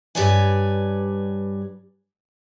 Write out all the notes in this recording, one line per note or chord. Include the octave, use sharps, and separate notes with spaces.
G2 G4 B4 C#5 D5 G#5